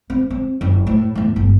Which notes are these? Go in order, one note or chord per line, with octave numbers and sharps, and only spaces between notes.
C4
C4
F#1 C#2
A2
E2 A2
G1